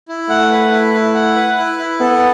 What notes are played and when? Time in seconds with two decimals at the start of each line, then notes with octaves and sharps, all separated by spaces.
0.09 E4
0.29 A3 F#5
0.51 B4
0.72 E4
0.94 E4
1.14 F#5
1.36 B4
1.58 E4
1.78 E4
2.00 B3 A4